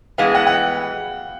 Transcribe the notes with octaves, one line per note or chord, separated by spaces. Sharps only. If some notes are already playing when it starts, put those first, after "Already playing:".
A2 E3 G#3 B3 F5
F#5
F#5
G5